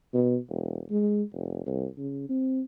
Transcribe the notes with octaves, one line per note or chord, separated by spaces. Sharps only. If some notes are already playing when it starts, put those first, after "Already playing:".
B2
E1
G#3
F1
C2
C#3
C4